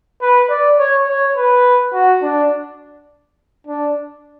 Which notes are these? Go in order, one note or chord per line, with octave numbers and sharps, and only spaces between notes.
B4
D5
C#5
C#5
B4
F#4
D4
D4